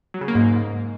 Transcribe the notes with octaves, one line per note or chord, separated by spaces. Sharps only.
F#3
C#3
A#3
G#2